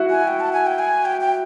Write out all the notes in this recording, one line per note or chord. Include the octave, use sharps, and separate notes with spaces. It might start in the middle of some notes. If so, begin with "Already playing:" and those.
Already playing: E4 F#4
G#5
G5
A5
G#5
G5
G#5
G5
G5